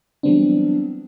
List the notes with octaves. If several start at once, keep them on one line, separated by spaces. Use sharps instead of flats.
E3 F#3 G3 B3 C4 D4